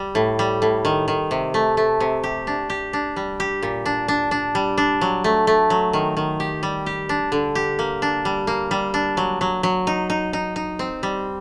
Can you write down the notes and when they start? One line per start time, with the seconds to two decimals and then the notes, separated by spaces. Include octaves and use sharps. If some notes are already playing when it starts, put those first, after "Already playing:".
Already playing: G3
0.15 A2
0.39 G3
0.62 A2
0.85 D#3
1.08 D#3
1.31 C3
1.54 A3
1.77 A3
2.00 C3
2.24 G4
2.47 D4
2.70 G4
2.93 D4
3.16 G3
3.40 G4
3.62 A#2
3.86 D4
4.08 D4
4.31 D4
4.55 G3
4.78 D4
5.01 F#3
5.24 A3
5.47 A3
5.70 F#3
5.93 D#3
6.17 D#3
6.40 G4
6.63 G3
6.86 G4
7.09 D4
7.32 D3
7.55 G4
7.79 A#3
8.02 D4
8.25 G3
8.47 A#3
8.71 G3
8.94 D4
9.17 F#3
9.41 F#3
9.63 F#3
9.87 D#4
10.10 D#4
10.33 D#4
10.56 D#4
10.79 C4
11.03 G3